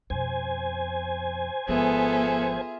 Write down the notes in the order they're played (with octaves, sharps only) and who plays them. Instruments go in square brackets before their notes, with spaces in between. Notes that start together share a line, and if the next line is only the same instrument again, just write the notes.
[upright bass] F2 B2 [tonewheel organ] C5 G#5
[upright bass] G#1 F3 [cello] B3 A4 [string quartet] F4 G#4 E5